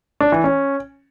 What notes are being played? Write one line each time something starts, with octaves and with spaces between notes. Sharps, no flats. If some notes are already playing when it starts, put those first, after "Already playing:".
D4
E3
C#4